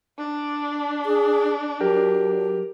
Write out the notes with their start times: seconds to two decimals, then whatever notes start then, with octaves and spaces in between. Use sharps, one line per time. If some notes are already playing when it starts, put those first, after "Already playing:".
0.18 D4
1.05 G#4
1.81 F#3 G4 A#4